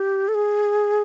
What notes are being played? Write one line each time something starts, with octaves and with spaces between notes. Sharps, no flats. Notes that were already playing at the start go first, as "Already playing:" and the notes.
Already playing: G4
A4
G#4